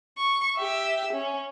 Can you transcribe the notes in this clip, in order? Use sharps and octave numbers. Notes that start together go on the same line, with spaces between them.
C#6
G4 E5
C#4